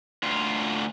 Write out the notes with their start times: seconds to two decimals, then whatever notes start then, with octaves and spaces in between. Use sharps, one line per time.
0.23 D2 F4